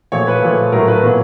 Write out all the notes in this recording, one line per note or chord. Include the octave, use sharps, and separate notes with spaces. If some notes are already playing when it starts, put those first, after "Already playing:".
A#2 F3 A3 C#5
B4
A#2 F3 A3
A2 F#3 A3 A#4
B4
A#2 F#3 B3